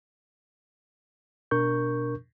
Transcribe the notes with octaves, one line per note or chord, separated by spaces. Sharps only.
B2 D4 A#4 C#6 G6